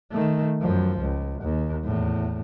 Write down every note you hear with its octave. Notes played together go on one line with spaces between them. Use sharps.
D#3 A3
F#2 F3
C#2
D#2
E2 A2